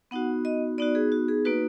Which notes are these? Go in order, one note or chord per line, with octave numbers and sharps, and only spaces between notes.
B3 D#4 F#4 F#5
D#5
B3 D#4 F#4 D5
G#4
F#4
G#4
A#3 D#4 F#4 B4